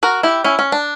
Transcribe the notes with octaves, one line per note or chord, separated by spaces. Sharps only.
F#4 A#4
E4 G4
C#4 E4
C#4
D4